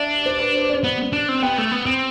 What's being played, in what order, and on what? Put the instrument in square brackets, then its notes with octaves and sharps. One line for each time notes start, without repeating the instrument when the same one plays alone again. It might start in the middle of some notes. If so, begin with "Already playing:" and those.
Already playing: [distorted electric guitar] D4 [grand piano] D5 E5
[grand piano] C5
B4
C5
D5
[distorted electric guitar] B3 [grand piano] D5
[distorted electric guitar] D4
C4
[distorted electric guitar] B3 [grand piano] G5
[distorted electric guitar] A3
B3
C4